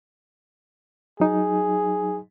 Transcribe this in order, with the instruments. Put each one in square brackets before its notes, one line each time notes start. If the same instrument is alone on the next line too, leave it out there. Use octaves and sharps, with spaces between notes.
[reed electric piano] F#3 D#4 [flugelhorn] G#4